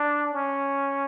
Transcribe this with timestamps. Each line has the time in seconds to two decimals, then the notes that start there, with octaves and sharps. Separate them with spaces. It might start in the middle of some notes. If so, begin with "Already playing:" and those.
Already playing: D4
0.34 C#4